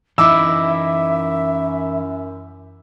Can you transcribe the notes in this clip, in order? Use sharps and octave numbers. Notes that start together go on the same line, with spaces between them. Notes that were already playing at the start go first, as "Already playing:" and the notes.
F#2 E3 D#4 E4 E5 D6 E6